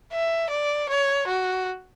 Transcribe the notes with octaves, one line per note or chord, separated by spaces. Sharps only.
E5
D5
C#5
F#4